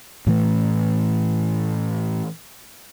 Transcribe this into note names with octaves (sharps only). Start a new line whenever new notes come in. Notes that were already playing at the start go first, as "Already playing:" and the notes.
A2 E3 A3